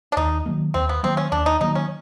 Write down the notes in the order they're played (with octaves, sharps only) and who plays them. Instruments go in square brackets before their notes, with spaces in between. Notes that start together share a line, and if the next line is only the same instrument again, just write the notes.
[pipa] D4
[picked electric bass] D#2 [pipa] D#4
[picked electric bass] D#3 F#3 A#3
[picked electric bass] D#2 [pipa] C4
[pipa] B3
[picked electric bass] D#3 F#3 A#3 [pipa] C4
[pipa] C#4
[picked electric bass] D#2 [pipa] D4
[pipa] D#4
[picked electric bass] D#3 F#3 A#3 [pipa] D#4
[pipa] C#4